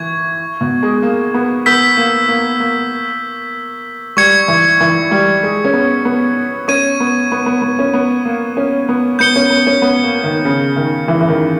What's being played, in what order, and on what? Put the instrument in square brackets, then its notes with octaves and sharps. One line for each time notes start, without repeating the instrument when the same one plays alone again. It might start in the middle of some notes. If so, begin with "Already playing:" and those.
Already playing: [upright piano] E3 [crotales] C#6 G#6
[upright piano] B2
G#3
A#3
B3
[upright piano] B3 [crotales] E6 G6 B6 G7
[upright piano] A#3
A#3
A#3
[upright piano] G3 [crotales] C#6 G#6 C#7
[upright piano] E3
E3
G3
G#3
C#4
B3
B3
[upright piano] C#4 [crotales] C#6 G#6 D#7
[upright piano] B3
B3
B3
B3
C#4
B3
A#3
C#4
B3
[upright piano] B3 [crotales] G6 C#7 G7
[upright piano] C#4
B3
C#4
B3
A#3
D#3
C#3
D#3
E3
E3
D#3